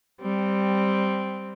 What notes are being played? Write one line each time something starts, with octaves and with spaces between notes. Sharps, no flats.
G3 C4